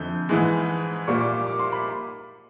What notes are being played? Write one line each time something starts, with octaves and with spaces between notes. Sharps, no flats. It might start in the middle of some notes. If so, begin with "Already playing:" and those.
Already playing: F2 D3 G6
G#2 E3 G#3
A#2 G3 A#3 C#6
D6
D6
C6
B5